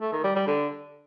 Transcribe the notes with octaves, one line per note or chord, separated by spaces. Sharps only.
A3
D#3
G3
G3
D3